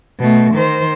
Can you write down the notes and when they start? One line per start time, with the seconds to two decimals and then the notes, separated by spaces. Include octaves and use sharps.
0.19 B2 A3
0.54 D#3 C5